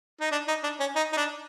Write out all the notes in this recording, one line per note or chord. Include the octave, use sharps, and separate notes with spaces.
D#4
D4
D#4
D4
C#4
D#4
D#4
D4